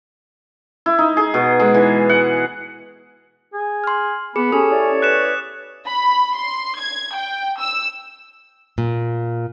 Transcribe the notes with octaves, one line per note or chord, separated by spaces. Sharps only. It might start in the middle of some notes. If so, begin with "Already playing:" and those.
E4
D#4
G#4
B2
G#3
E3
F#5
G#4
C6 F6
B3 G#4 B5 D6 C#7
C#4 G4 A4 D#6
E4 C#5 D5
B4 F#6 C#7 E7
B5
C6
G#6
G5
E6
A#2